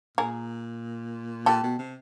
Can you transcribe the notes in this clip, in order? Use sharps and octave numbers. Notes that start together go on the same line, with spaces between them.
A#2 G#4 A#4
A#2 G4 A4
B2
C3